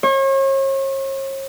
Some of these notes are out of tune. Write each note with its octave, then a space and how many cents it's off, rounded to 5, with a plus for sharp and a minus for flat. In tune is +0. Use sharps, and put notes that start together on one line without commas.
C#5 -40